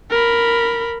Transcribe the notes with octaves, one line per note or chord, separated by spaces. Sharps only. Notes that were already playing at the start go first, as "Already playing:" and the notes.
A#4 B5